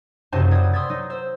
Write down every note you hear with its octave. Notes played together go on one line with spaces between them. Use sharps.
F#1 F#2 C3 D#4 C5 A5
B4 C5 D5 D#6 G6 G#6
C6 D#6 E6 G#6 A6 B6
F#3 D#4
C5 E6